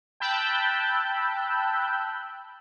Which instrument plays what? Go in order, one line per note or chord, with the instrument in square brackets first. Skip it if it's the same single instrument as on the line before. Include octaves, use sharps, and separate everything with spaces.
[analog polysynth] G5 A5 B5 E6 F#6 G6